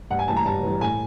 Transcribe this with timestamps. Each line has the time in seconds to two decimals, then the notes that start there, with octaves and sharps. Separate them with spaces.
0.11 G2 F#5
0.19 G#5
0.28 E3 G3 A5
0.36 A#5
0.45 G2 A5
0.63 E3 G3
0.81 A2 G#5